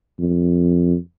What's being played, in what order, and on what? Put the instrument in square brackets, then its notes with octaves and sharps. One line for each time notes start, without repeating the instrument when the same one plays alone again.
[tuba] F2